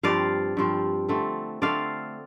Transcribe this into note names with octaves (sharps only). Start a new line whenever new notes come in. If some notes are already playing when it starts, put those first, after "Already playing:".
G2 F3 C4 D5 F5
G2 F3 C4
D3 A3 C4
D3 A3 C4 D5 F5